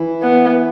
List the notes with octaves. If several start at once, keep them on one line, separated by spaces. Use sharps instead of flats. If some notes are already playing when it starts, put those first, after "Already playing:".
Already playing: E3 E4
B3